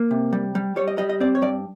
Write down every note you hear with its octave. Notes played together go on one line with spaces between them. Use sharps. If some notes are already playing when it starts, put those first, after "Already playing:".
Already playing: A#3
C3
G3
G3
G3 C#5
D#5
G3 D#5
D#5
C4 D5
C#5
G2 D5